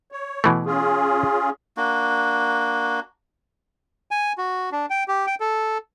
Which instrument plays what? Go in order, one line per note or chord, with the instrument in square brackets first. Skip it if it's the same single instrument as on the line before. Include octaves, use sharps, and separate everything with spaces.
[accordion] C#5
[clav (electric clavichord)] B2 E3 A3
[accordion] C#4 F4 G#4
[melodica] A#3 D4 F#4
[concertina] G#5
F#4
D4
G5
G4
G5
A4